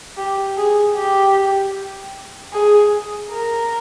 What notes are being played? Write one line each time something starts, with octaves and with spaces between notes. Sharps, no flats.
G4
G#4
G4
G#4
A#4